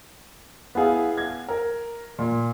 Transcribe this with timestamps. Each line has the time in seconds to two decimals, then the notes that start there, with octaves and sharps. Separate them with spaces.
0.75 B3 E4 G#4 F5
1.18 G#6
1.48 A#4
2.19 A#2